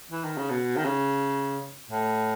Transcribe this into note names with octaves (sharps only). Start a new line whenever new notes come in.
E3
D#3
C#3
B2
D#3
C#3
A2